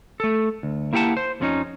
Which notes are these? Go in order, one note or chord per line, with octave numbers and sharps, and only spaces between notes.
A3 A4
D2
A#3 E4 G4 F5 F#5 A5
C5
F2 F3 B3 C#4 D#4